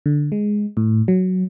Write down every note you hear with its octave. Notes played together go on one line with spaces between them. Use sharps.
D3
G#3
A2
F#3